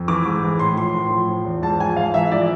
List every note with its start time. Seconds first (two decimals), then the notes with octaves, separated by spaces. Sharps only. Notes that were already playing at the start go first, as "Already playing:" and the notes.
Already playing: F2
0.08 E3 D6
0.26 G#2
0.43 E3
0.59 A2 C6
0.76 F3 C6
0.94 A2
1.10 F3
1.29 F3
1.45 E2
1.62 G#2 A5
1.80 F3 G#5
1.96 G#2 F5
2.14 E3 E5
2.24 E5
2.31 F3 D5